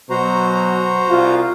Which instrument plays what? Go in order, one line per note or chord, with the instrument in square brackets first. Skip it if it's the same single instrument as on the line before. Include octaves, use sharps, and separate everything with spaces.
[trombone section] B2 F#3 [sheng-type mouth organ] F#4 C5 A#5
[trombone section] C2 F4